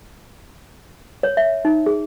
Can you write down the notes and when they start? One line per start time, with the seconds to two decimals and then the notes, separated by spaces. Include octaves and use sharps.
1.23 C#5
1.37 E5
1.65 D#4
1.86 G#4